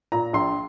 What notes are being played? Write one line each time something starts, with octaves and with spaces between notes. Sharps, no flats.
A#2 A#5
A#1 C6